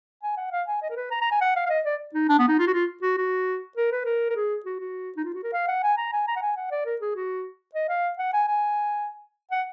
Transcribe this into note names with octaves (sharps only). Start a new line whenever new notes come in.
G#5
F#5
F5
G#5
D#5
A#4
B4
A#5
A#5
G#5
F#5
F5
F5
D#5
D5
D#4
D4
B3
D#4
F4
F#4
F4
F#4
F#4
A#4
B4
A#4
A#4
G#4
F#4
F#4
D#4
F4
F#4
A#4
F5
F#5
G#5
A#5
G#5
A#5
F#5
G#5
F#5
D5
A#4
G#4
F#4
D#5
F5
F#5
G#5
G#5
F#5